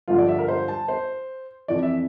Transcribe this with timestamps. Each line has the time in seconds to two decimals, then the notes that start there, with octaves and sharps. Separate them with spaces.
0.08 G2 D3 F3 F4
0.18 D5
0.28 E5
0.39 A#4
0.48 C5
0.68 A5
0.88 C5
1.68 F2 E3 D5
1.83 E5